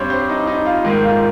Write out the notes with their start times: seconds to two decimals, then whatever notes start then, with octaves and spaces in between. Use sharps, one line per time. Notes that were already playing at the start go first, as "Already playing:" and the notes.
Already playing: G2 G3 C4 C5 C#5
0.10 C5
0.29 D#4
0.47 D#4
0.66 F4
0.84 G#2 D#3 A#3
1.04 F4